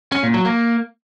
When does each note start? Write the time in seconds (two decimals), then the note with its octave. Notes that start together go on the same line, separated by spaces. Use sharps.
0.12 C#4
0.23 A#2
0.34 F#3
0.45 A#3